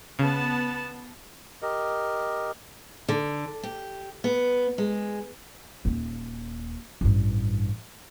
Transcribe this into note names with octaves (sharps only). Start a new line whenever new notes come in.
C#3 B3 A5
G4 A#4 D#5
D3
G4
B3
G#3
D#1 A#3
A1 G2